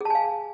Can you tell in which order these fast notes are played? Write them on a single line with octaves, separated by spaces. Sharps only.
G#4 A5 G#5 F5